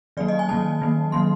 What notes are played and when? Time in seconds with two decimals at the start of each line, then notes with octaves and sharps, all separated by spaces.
0.17 D#3 F#3 A#3 D5
0.28 D#5
0.39 G#5
0.49 D#3 F#3 A#3 A5
0.81 D#3 F#3 A#3
1.12 D#3 F#3 A#3 C6